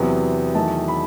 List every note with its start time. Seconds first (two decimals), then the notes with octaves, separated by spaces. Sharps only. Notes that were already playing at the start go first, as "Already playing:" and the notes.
Already playing: E2 C3 F#3 B3
0.55 E2 D#3 F#3 A3 A5
0.88 B5